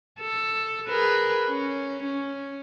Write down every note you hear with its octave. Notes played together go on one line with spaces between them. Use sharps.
A4
G#4 A#4 B4
C#4
C#4